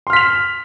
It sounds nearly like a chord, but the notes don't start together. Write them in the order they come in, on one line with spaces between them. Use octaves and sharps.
C6 F6 B6 F7